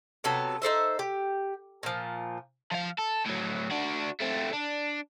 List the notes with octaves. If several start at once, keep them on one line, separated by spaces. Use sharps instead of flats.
C3 F#3 B3 A4
D#4 A4 C5 E5
G4
A#2 F3
F3 F5
A4
A2 F#3
D4 F#4
A3 C4
D4